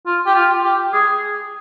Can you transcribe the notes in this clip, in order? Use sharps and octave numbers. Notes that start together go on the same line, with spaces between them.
F4
G4
F4
G4
G#4